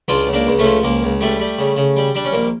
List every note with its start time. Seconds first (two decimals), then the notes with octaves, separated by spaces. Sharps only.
0.08 C#2 D4 F4
0.27 C#2
0.33 A#3 D4
0.47 C#2
0.59 A3 C#4
0.65 F3
0.83 C#2 A#3
1.03 C#2
1.21 G3 A3
1.39 G3
1.59 C#3
1.77 C#3
1.96 G3
2.15 G3 D4
2.25 C#4
2.33 A#1 A#3